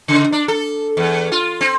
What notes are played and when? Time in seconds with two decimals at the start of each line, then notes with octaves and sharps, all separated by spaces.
0.08 C#3
0.32 D4
0.48 A4
0.97 E2
1.32 F4
1.61 C4